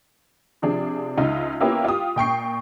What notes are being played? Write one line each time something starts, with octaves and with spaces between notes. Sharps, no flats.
C3 F3 D4 G#4
C#2 D#4 F4 E5
A#3 B3 C#4 E4 F4 G4
F4 G4 D#6
A#2 G5 C#6 C7